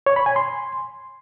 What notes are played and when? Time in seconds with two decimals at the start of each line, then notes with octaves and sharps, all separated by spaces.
0.06 C#5
0.16 B5
0.26 G#5
0.36 C6